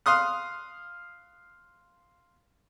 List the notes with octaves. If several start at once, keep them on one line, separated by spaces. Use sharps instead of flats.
F5 C6 D#6 F#6